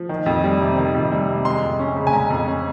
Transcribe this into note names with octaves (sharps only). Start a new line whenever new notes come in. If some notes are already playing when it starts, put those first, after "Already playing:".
Already playing: F3
D#3
F2
G3
C3
D#3
F2
G3
C3
G#3 C6
F2
C#4
C#3
G#5
G#3 A#5
F2
C#4